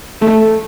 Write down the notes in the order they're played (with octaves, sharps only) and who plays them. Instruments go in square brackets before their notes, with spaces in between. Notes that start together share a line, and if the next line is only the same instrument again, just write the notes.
[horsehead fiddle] A3